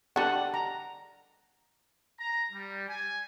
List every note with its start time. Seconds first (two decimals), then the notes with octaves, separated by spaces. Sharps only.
0.16 D3 G3 D4 F#5 A5
0.54 A#5
2.20 A#5
2.52 G3
2.88 G#5